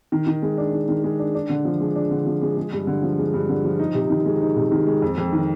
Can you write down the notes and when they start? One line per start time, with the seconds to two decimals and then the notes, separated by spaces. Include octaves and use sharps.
0.12 D#3
0.27 D#3
0.42 G#3
0.58 D4
0.73 D#3
0.88 D#3
1.04 G#3
1.19 D4
1.35 D4
1.49 D3
1.65 F3
1.80 G#3
1.95 D4
2.11 D3
2.26 F3
2.42 G#3
2.57 G#3
2.73 G2
2.87 D3
3.03 F3
3.18 G#3
3.34 G2
3.49 D3
3.65 F3
3.79 D#4
3.95 C3
4.10 D#3
4.26 G#3
4.41 D#4
4.56 C3
4.72 D#3
4.87 G#3
5.02 F2
5.18 F2
5.33 D#3